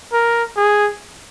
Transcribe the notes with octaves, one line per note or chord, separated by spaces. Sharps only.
A#4
G#4